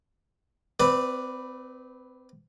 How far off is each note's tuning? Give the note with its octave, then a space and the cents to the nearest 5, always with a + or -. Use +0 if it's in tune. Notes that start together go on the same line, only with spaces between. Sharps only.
C4 -30 B4 +0 D5 +0